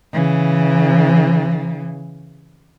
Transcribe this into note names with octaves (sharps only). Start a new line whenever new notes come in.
C#3 E3